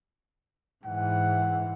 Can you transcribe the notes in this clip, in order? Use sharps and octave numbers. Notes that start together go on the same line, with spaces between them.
G#2 E3 F#5